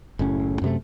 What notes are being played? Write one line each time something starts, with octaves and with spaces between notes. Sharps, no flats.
F#1 A2 C#4
F#2 C3 A3